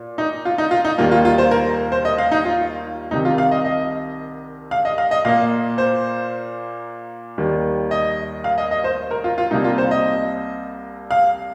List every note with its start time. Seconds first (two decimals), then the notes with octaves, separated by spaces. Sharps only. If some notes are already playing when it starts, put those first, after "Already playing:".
Already playing: A#2
0.18 D#4
0.45 F4
0.58 D#4
0.71 F4
0.85 D#4
0.98 D#2 D#3 G3 A#3 F4
1.11 F4
1.25 F4
1.38 C5
1.51 A#4
1.92 C5
2.05 D#5
2.18 F5
2.32 D#4
2.45 F4
3.11 C2 C3 D#3 D#4
3.25 F4
3.38 F5
3.51 D#5
3.65 D#5
4.71 F5
4.85 D#5
4.98 F5
5.11 D#5
5.25 A#2 A#3 F5
5.78 C5
7.38 D#2 D#3 G3
7.91 D#5
8.44 F5
8.58 D#5
8.71 D#5
8.84 C5
9.11 A#4
9.24 F4
9.38 F4
9.51 C2 C3 G3 A#3 D#4
9.64 F4
9.78 C5
9.91 D#5
11.11 F5